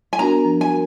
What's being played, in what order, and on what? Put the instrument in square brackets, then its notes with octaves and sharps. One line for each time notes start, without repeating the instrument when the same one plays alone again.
[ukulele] G#5
[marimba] B3 D4 F#4 A#4 [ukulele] A#5
[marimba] F3
[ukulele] G#5
[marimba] F#4 A#4